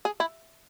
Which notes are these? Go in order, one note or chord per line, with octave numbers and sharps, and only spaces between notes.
G#4
E4